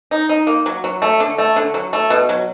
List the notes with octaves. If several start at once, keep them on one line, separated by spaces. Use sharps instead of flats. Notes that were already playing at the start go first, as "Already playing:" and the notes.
D#4
D#4
A#3
F#3
F#3
A3
D3
A3
D3
F#3
A3
B2
F#3